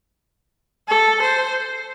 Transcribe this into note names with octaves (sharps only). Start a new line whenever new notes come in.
A4
C5